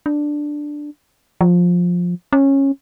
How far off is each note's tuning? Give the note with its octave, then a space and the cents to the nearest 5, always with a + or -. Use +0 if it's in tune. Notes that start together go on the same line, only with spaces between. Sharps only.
D4 +5
F3 +15
C#4 -15